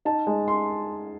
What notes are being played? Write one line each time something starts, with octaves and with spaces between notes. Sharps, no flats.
D#4 A5
G#3
C6